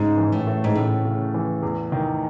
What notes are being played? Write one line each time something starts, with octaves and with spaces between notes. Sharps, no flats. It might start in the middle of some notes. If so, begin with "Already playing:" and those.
Already playing: G#2 C#3
E3
A2
A3
G#2
A2 C#3
C#3
E3
E2
D#3